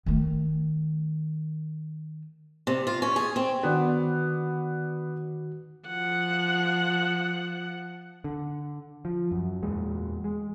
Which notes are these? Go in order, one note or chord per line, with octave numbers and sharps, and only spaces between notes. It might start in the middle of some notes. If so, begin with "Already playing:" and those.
D#3 A3
C3
F4
C#4
G#4
C4
D#3 B3 D4 F#4
F3 F#5
D3
F3
F#2
E2 A#2 G#3
G#3